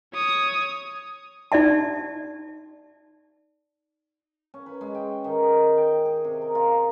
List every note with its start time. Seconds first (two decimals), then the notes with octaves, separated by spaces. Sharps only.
0.13 C#5 D#6
1.52 D#4 D5 E5 A5
4.54 C#4
4.66 B4
4.81 G#3
4.95 G5
5.24 D#3
5.43 D#5
5.59 C6
5.77 G5
6.05 G#4
6.24 C3
6.42 A#4
6.55 F4